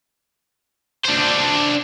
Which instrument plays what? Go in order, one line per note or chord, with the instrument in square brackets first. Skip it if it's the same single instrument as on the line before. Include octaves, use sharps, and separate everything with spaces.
[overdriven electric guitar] D4 C5